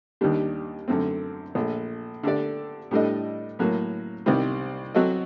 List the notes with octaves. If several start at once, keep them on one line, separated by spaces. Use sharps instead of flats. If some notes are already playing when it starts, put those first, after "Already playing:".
D#2 D#3 G3 D4 G4
F#2 D3 A3 C4
A#1 A#2 A3
D3 A3 D4 G4 D5
A2 G3 D4 A4 D#5
A2 F#3 A#3
C2 C3 D#3 G3 C4
F#3 C4 F#4 A4 D#5